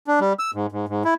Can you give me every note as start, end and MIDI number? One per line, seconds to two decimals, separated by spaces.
0.07 0.20 62
0.20 0.33 55
0.39 0.51 88
0.54 0.66 44
0.72 0.86 44
0.89 1.03 44
1.05 1.14 64